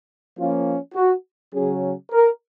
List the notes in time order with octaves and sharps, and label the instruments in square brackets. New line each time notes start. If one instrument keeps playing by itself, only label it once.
[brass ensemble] F3 A#3 C#4 F4
F#4
C#3 F#3 C#4 G#4
A#4